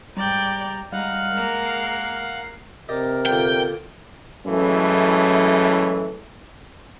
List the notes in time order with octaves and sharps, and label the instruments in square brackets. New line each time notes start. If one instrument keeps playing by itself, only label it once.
[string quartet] G#2 [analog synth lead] G3 [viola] D5 G5 [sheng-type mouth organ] A#5
[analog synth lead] G3 [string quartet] G#3 [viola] D#4 [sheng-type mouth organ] F5 F#5 F6
[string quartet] G#3 A#3 [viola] A#4
[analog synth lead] C7
[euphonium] C3 [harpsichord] G4 D5 D#5 [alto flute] A#4
[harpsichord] A#2 D3 B3 [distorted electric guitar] G5
[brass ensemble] F#2 A2 C#3 E3 G#3 A3